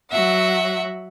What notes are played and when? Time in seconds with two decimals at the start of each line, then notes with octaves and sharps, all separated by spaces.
0.11 F#3 E5 F#5